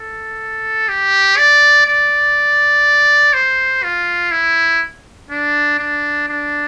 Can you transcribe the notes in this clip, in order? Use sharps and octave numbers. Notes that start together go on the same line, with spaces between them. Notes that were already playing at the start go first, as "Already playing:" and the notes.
Already playing: A4
G4
D5
D5
C5
F4
E4
D4
D4
D4